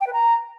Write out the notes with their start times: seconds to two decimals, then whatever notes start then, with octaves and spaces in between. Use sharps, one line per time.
0.01 G5
0.07 B4
0.13 A#5